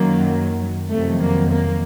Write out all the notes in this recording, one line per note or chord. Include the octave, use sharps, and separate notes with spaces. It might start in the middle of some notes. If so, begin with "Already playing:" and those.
Already playing: F#2 D#3 F#3 A#3
F2 C3 D#3 F#3 A3
A#3
A#3